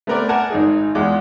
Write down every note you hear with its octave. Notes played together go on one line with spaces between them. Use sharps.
A3 B3 C4 A#4 B4 D5
A#4 D5 F#5 G#5 A5
G#1 D#4 G#4
E2 G#3 F4 D6